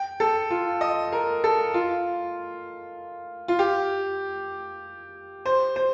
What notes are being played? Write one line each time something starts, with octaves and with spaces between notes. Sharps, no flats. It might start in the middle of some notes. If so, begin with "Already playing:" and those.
Already playing: G5
A4
F4
D#5
A#4
A4
F4
F4
G4
C5
C5